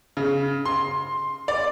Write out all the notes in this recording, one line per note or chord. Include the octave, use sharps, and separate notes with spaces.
C#3
C6
D5